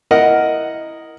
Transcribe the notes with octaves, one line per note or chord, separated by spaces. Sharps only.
E4 A#4 D#5 F#5